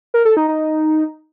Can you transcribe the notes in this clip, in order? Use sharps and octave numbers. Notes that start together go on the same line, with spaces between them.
A#4
A4
D#4
D#4